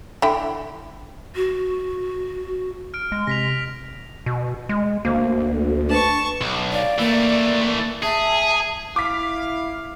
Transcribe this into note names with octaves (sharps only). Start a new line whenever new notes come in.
D3 E4 G5
F#4
F6 D7
G#3
C3 A#6 B6 F7
B2
G#3
D2 A#3 F#4 C5
D4 B4 A5 C#6
B1
D5 F5
E3 A3 A#3
G#4 E5 A5
E4 F5 D6 B6